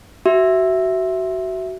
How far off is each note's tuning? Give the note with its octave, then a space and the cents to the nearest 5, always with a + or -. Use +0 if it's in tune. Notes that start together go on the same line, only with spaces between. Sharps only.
F#4 +20 E5 +0